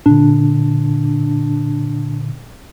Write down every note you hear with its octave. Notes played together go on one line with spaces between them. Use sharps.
A#2 D3 D4